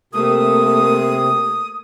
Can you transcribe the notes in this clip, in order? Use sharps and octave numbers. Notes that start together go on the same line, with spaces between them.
C3 A3 A#3 D#6